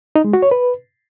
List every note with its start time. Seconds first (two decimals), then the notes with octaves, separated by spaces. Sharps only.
0.16 D#4
0.24 G#3
0.33 F#4
0.42 C#5
0.51 B4